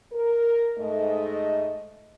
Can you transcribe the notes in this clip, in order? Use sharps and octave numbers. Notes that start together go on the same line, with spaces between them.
A#4
G#2 A3 D#5